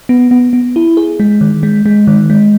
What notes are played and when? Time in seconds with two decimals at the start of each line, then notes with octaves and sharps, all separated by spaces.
0.09 B3
0.31 B3
0.53 B3
0.76 E4
0.97 G#4
1.20 G#3
1.41 D#3
1.63 G#3
1.86 G#3
2.07 D#3
2.30 G#3